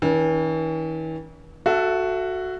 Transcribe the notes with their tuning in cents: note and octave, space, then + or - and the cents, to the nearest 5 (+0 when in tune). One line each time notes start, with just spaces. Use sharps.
E3 -45 C#4 +30
F#4 +0 A4 +0 E5 +30